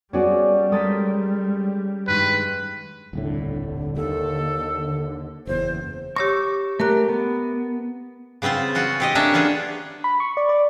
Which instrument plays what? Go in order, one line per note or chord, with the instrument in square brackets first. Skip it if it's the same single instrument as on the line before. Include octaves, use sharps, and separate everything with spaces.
[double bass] G3 [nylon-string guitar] B3 F#4 G#4 [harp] C#4 C#5 D5
[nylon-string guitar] G#3 A4 A#4 [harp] D#6 A6 B6
[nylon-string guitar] G2 D#3 G#3 [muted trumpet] B4
[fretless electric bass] D#1 C2 A2 [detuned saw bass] D3
[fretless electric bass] D#2 [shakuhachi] A4
[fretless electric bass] F#1 E2 [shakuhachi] C5
[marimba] G4 C#5 A#6 [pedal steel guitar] C#6 D6 E6
[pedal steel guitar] A3 G4 [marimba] A#4 A#5 F#6
[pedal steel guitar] B3
[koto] C#3 B3 C4 F4 C5
C#4 F4 F#4
C4 G4 D#5
A3 A#3 C#4 D4 C#5 E5
B3 C#4 D4 F4 G#4
[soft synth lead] B5
C#6
D5
D5